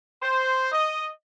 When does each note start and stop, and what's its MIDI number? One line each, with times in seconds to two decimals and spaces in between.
0.22 0.71 72
0.71 1.08 75